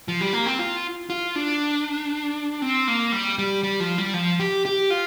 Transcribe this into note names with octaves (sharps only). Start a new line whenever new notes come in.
F3
G3
A#3
C4
F4
F4
D4
C4
A#3
G3
G3
G3
F3
G3
F3
G4
G4
F4